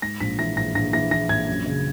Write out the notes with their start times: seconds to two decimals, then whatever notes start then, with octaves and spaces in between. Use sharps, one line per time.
0.02 G#2 A#6
0.20 A#1 B6
0.39 E3 A#6
0.57 A#1 A#6
0.75 A#1 A#6
0.93 E3 A#6
1.11 E3 A#6
1.29 A#1 G#6
1.48 F#2
1.66 C#3